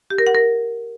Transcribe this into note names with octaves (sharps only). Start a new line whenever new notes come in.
G4
A#4
F#5
A#4